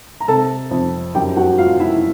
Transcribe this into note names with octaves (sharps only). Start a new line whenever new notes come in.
A#5
C3 A4 A5
F2
F#2 G4 G5
F#4 F#5
F#3 F4 F5
E4 E5